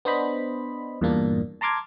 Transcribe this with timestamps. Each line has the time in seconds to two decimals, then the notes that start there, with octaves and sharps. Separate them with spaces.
0.05 B3 D4 C5 D#5 B5
1.01 E2 G2 A#2 A#3 D4
1.61 A5 A#5 C6 D6 F6 G#6